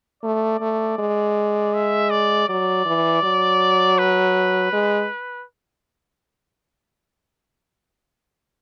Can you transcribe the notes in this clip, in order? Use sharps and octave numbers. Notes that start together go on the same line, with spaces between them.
A3 D5
A3
G#3
E5
D5
F#3 D5
E3
F#3
B4
G#3